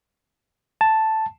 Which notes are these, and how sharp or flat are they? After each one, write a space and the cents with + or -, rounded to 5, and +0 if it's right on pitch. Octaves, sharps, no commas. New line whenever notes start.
A5 +0